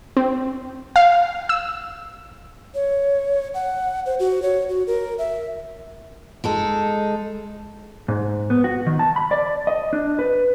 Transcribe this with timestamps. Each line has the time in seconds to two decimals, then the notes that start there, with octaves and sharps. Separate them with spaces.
0.17 C4
0.96 F5
1.49 E6
2.75 C#5
3.54 F#5
4.06 C5
4.19 F#4
4.42 C#5
4.69 F#4
4.87 A#4
5.18 E5
6.44 G#3 D#4 A4
8.08 G#2
8.50 B3
8.64 F#4
8.86 D#3
8.99 A5
9.16 B5
9.31 D5
9.67 D#5
9.93 D4
10.19 B4